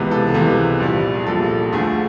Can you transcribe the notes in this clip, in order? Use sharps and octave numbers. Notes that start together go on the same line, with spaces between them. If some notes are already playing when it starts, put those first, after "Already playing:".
Already playing: C#2 C3 E3 G#3 B3
A4
C#2 C3 E3 G#3 B3
A#1 A#2 G3
G#4
A#1 A#2 G3 A4
D2 D3 F3 A3 G#4